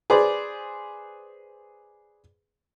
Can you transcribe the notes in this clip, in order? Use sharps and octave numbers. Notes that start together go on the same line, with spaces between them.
G#4 B4 C5 D5